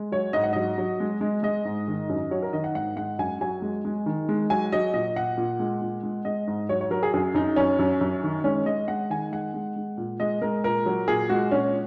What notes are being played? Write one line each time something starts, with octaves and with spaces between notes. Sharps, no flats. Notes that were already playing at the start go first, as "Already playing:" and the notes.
Already playing: G#3
F#3 C#5
G#2 D#5
F#5
F#3 D#5
F#3
G#3
G#3
G#3 D#5
G#2
D#3
F#2
F#3 C#5
A#4
D#3 D#5
F#5
G#2 F#5
G#3 F#5
F#2 G#5
F#3 G#5
G#3
G#3
D#3
G#3
F#3 G#5
F#3 D#5
A#2 D#5
A#2 F#5
A#2
G#3
A#2
G#3
G#3 D#5
G#2
F#3 C#5
C#5
F#3 A#4
G#4
F#2 G#4
F#2 D#4
F#2 C#4
F#2
F#2
D#3
G#3 C#4
G#3 D#5
G#3 F#5
D#3 G#5
G#3 F#5
G#3
G#3
A#2
G#3 D#5
G#3 A#4
A#2 A#4
F#3
A#2 G#4
G#3 F#4
A#2 C#4